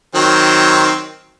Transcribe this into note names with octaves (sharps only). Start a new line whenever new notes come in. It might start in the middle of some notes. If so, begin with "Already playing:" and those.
D#3 F#3 C4